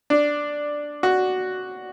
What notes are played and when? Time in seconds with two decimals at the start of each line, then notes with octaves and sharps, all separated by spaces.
0.10 D4
1.03 F#4